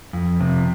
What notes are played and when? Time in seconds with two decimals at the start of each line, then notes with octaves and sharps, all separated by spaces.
0.13 F2
0.41 C3